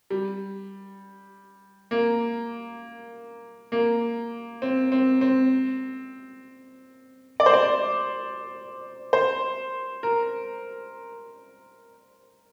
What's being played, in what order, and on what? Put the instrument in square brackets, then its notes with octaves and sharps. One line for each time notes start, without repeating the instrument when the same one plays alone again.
[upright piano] G3
A#3
A#3
C4
C4
C4
D5
C5
D5
C5
A#4